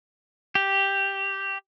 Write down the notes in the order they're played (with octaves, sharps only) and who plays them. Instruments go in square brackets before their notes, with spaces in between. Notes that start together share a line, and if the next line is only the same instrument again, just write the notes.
[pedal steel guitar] G4